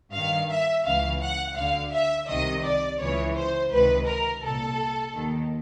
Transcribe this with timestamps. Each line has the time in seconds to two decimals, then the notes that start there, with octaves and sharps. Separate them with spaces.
0.14 G2 D#3 F5
0.50 E5
0.85 C#2 C#3 E3 F5
1.21 F#5
1.57 D2 D3 F5
1.92 E5
2.28 C2 C3 D#3 D#5
2.64 D5
3.00 C#2 C#3 E3 C#5
3.36 C5
3.72 C#2 C3 D#3 B4
4.07 A#4
4.43 C2 A#2 A4
5.14 D#2 D#3